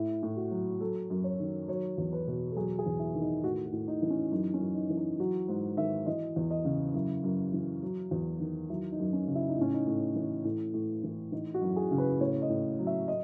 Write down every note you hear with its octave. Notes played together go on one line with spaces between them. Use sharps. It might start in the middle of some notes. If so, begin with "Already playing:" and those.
Already playing: A2 E4
A2
F#4
F#3
F#3 A4
F#2
C#5
D#3
F#3 C#5
E2
B4
B2
A4
F#3 G#4
G#4
E2
E4
D#3
D#4
A2 F#4
F#4
A2
D#4
E3
C#4
F#2 D#4
C#4
F#2
D#4
E3
D#4
F#3 F#4
G#2
D#3 E5
E3 D#5
E2
D#5
C#3
F#2 E4
F#2
E3
F#3
E2
D#3
F#3 E4
D#4
F#2
C#4
C#3
E4
D#4
A2 C#4
D#4
A2
E3
A2
A2
E3
E3 D#4
F#4
F#2
G#4
C#3
B4
A2 C#5
D#5
A2
F#3
E5
D#5